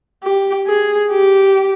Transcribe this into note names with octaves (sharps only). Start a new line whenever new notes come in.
G4
G#4
G4